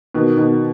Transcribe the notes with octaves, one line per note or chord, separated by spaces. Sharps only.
B2 D#3
B2 D#3